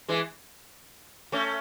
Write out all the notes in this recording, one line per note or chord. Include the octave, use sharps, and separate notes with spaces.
E3 G#3
A3 C#4